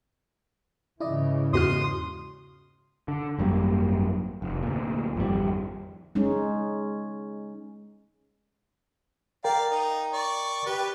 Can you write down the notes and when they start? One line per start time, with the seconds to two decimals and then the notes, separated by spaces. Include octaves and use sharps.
1.00 G#2 C#3 E3 E4 D5 D#5
1.53 E2 F#4 C6 D#6 F6
3.08 D3
3.38 G#1 F#2 G3 A#3
4.42 F1
4.63 D2 A#2
5.17 G#1 F2 D3 G3
6.15 G#3 C#4 D#4
9.44 A#4 D5 F5 G5 A#5
9.71 D#4
10.13 D5 C#6
10.66 G4 B4